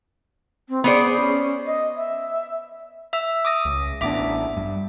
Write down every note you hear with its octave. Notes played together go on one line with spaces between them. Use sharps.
C4
B3 G#4 C5 D5
C#4
D#5
E5
E5 E6
D6 D#6 A#6
C#2
A1 B3 D4 E5 D6
G2